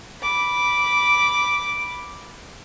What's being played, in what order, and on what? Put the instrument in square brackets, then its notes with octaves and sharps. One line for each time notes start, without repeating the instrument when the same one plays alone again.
[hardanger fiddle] B5 D6